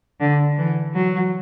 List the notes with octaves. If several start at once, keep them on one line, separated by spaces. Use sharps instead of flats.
D3
E3
F#3